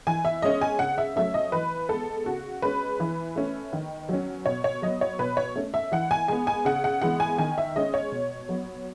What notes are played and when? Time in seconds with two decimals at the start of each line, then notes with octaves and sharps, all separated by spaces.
0.07 E3 G#5
0.25 E5
0.42 G#3 C#4 D#5
0.61 G#5
0.79 C#3 F#5
0.98 E5
1.16 F#3 A3 C#4 E5
1.34 D#5
1.52 E3 B4
1.89 G#3 B3 A4
2.26 C#3 F#4
2.62 G#3 C#4 B4
3.00 E3
3.36 A3 C#4
3.73 D#3
4.09 F#3 C#4
4.46 B2 C#5
4.64 C#5
4.82 F#3 B3 D#5
5.01 C#5
5.19 B2 B4
5.37 C#5
5.55 A3 C#4
5.74 E5
5.92 E3 F#5
6.11 G#5
6.28 G#3 B3 G#5
6.47 G#5
6.65 C#3 F#5
6.84 F#5
7.02 E3 G#3 B3 F#5
7.20 G#5
7.38 D#3 G#5
7.58 E5
7.76 G#3 C#4 D#5
7.94 C#5
8.12 B2
8.49 F#3 B3